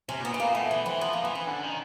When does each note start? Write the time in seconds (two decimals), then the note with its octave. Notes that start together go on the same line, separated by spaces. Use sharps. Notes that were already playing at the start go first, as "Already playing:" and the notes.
0.09 C3 C#4
0.20 A#2 B3
0.32 B2 B3
0.40 A#2 A#3
0.55 B2 A3
0.70 E3 A3
0.86 E3 C4
1.01 F3 B3
1.13 A#3
1.24 E3 B3
1.35 C#4
1.47 D3
1.63 D#3